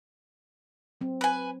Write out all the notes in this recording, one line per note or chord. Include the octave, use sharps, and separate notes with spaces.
F#3 C4
B4 G#5